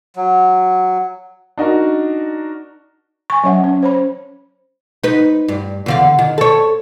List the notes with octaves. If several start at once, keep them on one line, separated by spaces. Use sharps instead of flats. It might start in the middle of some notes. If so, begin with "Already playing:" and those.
F#3
D4 D#4 F#4 A#4
G#5 C#6
F#3 C#4 C#5 E5 F#5
C#4
C5 C#5 B5
D#4 B4
G2
E2 D3 F5
D#3
A4 C#5